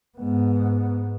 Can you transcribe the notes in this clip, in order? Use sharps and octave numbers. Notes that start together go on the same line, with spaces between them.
G#2 B3